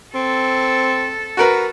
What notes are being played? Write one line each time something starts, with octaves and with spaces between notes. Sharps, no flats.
C4 A4
F#4 A#4 B4